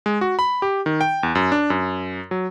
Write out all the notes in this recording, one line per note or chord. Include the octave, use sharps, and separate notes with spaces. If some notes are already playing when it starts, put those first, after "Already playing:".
G#3
F#4
B5
G4
D#3
G5
E2
F#2
D4
F#2
F#3